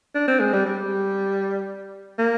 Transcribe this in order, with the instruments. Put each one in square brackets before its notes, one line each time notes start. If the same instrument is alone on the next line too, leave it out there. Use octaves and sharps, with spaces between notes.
[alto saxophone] D4
C4
G#3
G3
G3
A#3